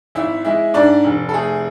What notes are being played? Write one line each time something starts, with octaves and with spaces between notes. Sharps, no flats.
G#1 E4 E5
G#3 E4 E5
G#2 D4 D5
F1
A4
A3 G#4